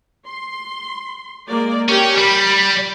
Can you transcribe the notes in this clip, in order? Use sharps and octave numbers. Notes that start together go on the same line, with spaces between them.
C6
G#3 A#3 D5
C#4 G4 A#4 G5
G3 B5